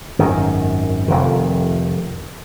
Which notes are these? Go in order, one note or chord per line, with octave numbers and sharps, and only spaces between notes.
G#1 F#2 D#3
F1 F2 D#3